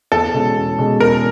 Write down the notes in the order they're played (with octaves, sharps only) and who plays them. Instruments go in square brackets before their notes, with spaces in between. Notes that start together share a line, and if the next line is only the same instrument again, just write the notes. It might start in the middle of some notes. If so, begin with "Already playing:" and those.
[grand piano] E2 [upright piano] A4
[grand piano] B2 G#3 C#4
E2
B2 G#3 C#4
[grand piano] E2 [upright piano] A#4